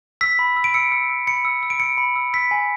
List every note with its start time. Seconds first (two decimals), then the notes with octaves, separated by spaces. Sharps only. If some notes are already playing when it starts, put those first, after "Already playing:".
0.21 E6 B6
0.39 B5
0.56 E6
0.64 D7
0.74 E6 C#7
0.92 E6
1.09 E6
1.27 B5 C#7
1.45 E6
1.63 E6
1.70 D7
1.80 E6 C#7
1.98 B5
2.16 E6
2.33 E6 B6
2.51 G#5